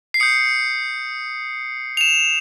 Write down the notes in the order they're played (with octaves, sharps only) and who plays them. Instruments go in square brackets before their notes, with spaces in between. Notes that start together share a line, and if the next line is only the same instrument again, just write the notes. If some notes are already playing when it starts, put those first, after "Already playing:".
[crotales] C7
D#6 G6 C#7
F7
E7